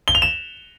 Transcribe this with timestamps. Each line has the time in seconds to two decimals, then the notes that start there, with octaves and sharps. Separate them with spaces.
0.08 G7
0.15 F7
0.22 E7